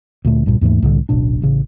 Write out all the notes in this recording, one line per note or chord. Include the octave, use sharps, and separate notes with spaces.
D2 A#2 A3
C2 G2 A#2
D#2 G#2 E3 A3
C2 A2 D3
D1 A1 B2 D4
A1 C#3